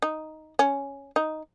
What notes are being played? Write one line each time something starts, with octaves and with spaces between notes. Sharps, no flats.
D#4
C#4
D#4